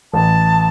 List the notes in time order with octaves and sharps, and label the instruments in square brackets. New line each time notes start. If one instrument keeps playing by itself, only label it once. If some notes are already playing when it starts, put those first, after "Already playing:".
[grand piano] A1 [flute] A5